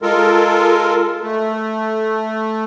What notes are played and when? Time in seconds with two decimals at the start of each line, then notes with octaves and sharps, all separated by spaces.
0.02 G#3 F4 A4 A#4
1.22 A3